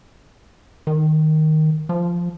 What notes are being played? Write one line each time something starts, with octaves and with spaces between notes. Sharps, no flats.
D#3
F3